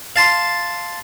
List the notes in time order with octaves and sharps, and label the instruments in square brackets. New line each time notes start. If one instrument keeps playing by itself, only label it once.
[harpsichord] F5 A5 C6